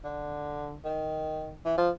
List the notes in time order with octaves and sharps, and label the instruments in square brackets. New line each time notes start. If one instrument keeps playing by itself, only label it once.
[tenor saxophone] D3
D#3
E3
F3